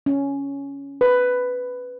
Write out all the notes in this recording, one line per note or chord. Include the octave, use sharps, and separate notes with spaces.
C#4
B4